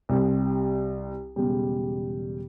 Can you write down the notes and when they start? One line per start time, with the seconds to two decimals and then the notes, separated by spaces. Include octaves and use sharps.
0.09 C2 C3 G3
1.36 E1 E2 C#3 G3